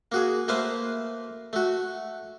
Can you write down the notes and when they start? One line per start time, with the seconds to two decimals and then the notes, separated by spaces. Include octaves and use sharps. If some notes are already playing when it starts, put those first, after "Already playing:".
0.12 A#3 F#4 G#4
0.48 A3 A#3 B4 C5 F5
1.53 A3 F#4